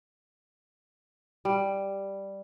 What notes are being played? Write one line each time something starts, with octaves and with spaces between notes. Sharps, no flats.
G3